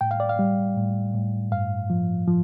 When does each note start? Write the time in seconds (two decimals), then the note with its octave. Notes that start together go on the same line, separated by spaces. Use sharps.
0.01 A2 G5
0.11 F5
0.20 D5
0.29 F5
0.39 G3
0.77 A2
1.15 A2
1.52 G2 F5
1.90 F3
2.27 F3